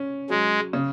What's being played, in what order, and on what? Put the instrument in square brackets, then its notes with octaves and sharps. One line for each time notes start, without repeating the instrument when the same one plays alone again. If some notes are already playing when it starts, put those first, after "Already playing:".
Already playing: [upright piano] C#4
[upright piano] F#3 [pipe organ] G#3
[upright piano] C#3